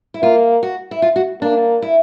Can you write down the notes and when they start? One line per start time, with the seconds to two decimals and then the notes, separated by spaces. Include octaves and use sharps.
0.14 E4
0.22 A#3 F4
0.63 F#4
0.91 E4
1.02 F4
1.16 F#4
1.42 A#3 D4
1.82 E4